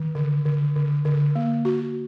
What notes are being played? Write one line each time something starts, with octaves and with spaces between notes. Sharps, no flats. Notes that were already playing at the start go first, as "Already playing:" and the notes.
Already playing: D#3
D3
D3
D3
D3
A#3
F#4